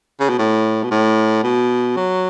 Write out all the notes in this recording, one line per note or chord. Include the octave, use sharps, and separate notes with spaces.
C#3
B2
A2
B2
A2
B2
F#3